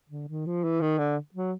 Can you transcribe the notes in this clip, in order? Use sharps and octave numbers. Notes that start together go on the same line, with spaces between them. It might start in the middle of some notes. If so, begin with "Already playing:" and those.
D3
D#3
F3
E3
D#3
D3
F#3